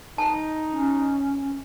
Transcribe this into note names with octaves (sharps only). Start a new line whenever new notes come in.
D#4 A5
C#4